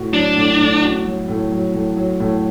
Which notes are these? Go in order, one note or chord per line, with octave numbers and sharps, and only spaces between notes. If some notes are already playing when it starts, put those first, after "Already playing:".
Already playing: A2 F#4
F#3 D4
A2
A2
F#4
F#3
A2
F#3
A2
F#3
A2